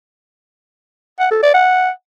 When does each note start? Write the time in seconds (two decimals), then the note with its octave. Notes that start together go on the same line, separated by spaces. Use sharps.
1.20 F#5
1.31 A4
1.42 D5
1.54 F#5